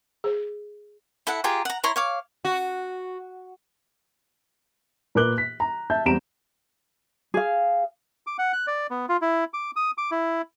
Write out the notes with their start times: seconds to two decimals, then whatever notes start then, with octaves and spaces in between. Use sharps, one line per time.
0.24 G#4 C5
1.27 E4 A4 E5 F#5
1.44 F4 G4 G#4 A#5
1.65 F#5 A#5
1.84 E4 C#5 A#5 C6
1.96 C#5 F5 D6
2.45 F#4
5.15 A#2 A#4 B4 D6 F#6 G7
5.38 B6
5.60 A#5
5.90 E5 A5 G6
6.05 E2 G3 C4 A#5 D7 E7
7.34 G#4 F5
8.27 D6
8.38 F#5
8.53 F#6
8.67 D5
8.90 B3
9.09 F4
9.22 E4
9.54 D6
9.76 D#6
9.98 D6
10.11 E4